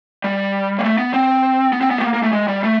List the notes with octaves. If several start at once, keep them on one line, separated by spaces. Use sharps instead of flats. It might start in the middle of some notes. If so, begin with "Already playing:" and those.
G3
A#3
A3
B3
C4
B3
C4
B3
A3
A#3
A#3
A3
G#3
G3
A3